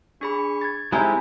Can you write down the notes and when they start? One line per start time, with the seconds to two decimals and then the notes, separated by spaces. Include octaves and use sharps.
0.21 D4 G#4 B5 C#6
0.61 G#6 A6
0.92 G#3 C4 D#4 E4 G4 A4 G#5 B5